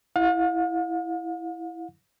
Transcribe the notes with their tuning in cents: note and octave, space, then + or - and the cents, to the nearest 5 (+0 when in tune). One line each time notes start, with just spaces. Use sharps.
E4 +0 F5 +45